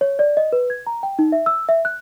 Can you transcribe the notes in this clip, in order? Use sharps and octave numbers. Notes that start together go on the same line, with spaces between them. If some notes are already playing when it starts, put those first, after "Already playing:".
C#5
D5
D#5
B4
G#6
A#5
G5
D#4
E5
E6
E5
F#6